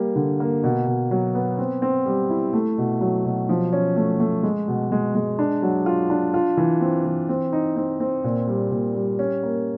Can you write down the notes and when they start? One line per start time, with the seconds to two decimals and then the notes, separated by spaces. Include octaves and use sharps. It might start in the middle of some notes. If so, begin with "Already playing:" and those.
Already playing: G3 A#3
0.16 D3
0.40 A#3
0.63 B2
0.87 B2
1.11 F#3
1.35 B3
1.58 C4
1.82 C4
2.06 G3
2.30 E4
2.53 A3
2.78 B2
3.01 F#3
3.25 B2
3.49 F3
3.73 C#4
3.96 A3
4.20 A3
4.43 G#3
4.68 B2
4.92 G#3
5.15 G#3
5.39 D4
5.63 F#3
5.86 F4
6.10 D4
6.34 F4
6.57 E3
6.81 C4
7.05 E3
7.29 C4
7.53 D#4
7.76 C4
8.00 C4
8.24 A#2
8.47 G3
8.71 A#2
8.95 G3
9.19 C#4
9.43 A#3